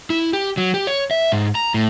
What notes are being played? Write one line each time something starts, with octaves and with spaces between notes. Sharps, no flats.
E4
G4
F#3
G4
C#5
E5
G#2
A#5
A2